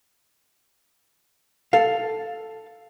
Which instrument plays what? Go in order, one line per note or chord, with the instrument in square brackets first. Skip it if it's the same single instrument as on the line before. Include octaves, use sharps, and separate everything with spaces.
[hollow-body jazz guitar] A4 F5